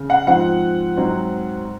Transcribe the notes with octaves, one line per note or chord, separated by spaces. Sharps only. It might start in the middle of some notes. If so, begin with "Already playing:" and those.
Already playing: C#3
F#5
G#2 F3 C4 F#5
G#2 F#3 C4